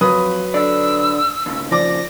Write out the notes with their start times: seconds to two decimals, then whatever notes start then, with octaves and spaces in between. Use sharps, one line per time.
0.01 F2 F#3 B4 D#6
0.54 D3 D5 E6
1.46 D#2 C#3
1.71 F3 D5 D6 A#6